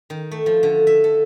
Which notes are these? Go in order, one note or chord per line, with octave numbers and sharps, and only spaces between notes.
D#3
A3
F3
D3
E5
A4